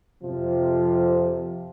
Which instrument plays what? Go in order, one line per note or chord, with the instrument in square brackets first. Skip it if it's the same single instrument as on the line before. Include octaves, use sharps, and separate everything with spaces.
[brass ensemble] F2 C3 F3